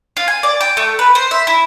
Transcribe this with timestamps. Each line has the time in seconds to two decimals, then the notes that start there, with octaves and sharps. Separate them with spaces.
0.17 F4
0.28 G#5
0.43 D5
0.61 G5
0.77 A3
0.99 B4
1.15 C5
1.31 E5
1.47 E4